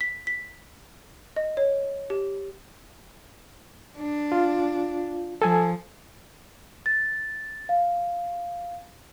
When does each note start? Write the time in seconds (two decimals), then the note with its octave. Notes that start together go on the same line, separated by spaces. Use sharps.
0.01 B6
0.27 B6
1.36 D#5
1.57 C#5
2.10 G4
3.99 D4
4.32 F4
5.42 F3 A4 G#5
6.86 A6
7.69 F5